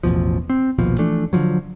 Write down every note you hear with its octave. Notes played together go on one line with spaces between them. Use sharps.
A1 E2 B2 F3
C4
A#1 D#2 B2 F3
E3 F3 A3 D4
D3 D#3 F3 F#3